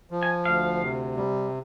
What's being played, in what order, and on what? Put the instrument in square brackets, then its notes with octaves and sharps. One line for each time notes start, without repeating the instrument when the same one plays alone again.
[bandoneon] F3
[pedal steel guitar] G#5
[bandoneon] D2 [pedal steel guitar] F5
[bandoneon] C3
G3